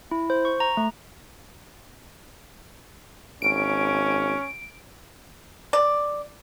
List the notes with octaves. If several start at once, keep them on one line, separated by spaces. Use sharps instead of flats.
E4
C5
C#6
A#5
A3
G#1 C#4 D7
D5